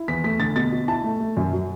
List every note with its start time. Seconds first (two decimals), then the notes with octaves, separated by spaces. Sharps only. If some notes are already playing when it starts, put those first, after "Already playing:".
Already playing: E4
0.08 E2 B6
0.24 A3 B6
0.39 D3 A6
0.56 B2 A6
0.72 B2
0.88 E4 A5
1.04 A3
1.20 A3
1.37 F#2
1.53 F#3